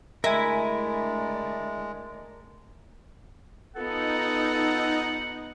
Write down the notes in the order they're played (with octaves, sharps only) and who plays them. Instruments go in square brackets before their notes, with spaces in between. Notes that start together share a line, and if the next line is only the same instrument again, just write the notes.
[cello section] D3 A3 D5 [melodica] G#3 [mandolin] E4 [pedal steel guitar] A#4 G#5
[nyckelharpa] B3 [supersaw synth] D#4 [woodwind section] F4 A4 [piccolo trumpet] F#5